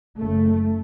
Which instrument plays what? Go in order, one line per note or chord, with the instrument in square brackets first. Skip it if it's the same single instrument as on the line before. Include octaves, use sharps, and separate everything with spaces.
[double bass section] F#1 F#2 C#3 A3